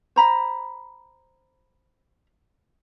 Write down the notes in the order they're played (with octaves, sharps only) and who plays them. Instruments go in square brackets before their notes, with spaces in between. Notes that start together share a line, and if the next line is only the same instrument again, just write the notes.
[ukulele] C5 A#5 B5